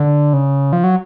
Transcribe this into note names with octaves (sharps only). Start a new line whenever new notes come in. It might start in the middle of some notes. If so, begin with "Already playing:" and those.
Already playing: D3
C#3
F3
F#3